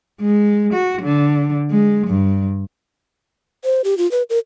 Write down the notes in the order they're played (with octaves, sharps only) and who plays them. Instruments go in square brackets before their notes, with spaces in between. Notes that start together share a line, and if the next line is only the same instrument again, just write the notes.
[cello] G#3
F#4
D3
G#3
G2
[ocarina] C5
G4
F4
B4
A#4